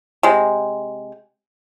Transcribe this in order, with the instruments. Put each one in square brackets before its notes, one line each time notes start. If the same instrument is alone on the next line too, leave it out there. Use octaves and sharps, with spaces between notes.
[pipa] C3 G#3